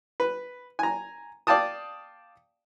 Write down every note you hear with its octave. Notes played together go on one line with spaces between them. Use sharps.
B4
G#5 A#5
D5 F5 G5 A5 D#6